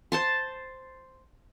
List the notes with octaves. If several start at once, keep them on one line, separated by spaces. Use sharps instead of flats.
C5 A5 C6